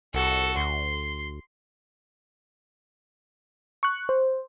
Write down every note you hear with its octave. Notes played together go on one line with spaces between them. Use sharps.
C2 F#4 A4
D2 C6
C#6 F#6
C5